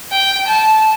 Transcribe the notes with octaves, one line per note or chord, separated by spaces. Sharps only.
G5
A5